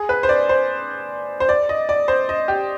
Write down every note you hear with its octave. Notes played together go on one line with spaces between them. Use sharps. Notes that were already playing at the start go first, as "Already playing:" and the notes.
Already playing: G#4
B4
C5
D5
C5
C5
D5
D#5
D5
C5
D#5
G4